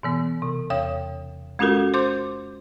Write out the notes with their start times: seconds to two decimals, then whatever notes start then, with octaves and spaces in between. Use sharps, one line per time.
0.03 B2 E3 B3
0.42 C3
0.70 E2 C#5 G5 D#6
1.59 G#3 C#4 F4 F#4 A4 A#4
1.94 C5 C6 D6 G6